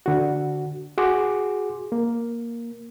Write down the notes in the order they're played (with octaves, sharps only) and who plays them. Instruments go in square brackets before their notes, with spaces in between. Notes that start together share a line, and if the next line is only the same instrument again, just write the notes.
[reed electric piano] D3 F#4
F#4 G#4 C6 D6
A#3